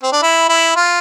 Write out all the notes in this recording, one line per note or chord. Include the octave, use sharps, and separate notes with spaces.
C4
D4
E4
E4
F4